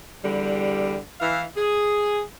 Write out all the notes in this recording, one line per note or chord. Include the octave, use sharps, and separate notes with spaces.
E2 D3 G3
E3 F5
G#4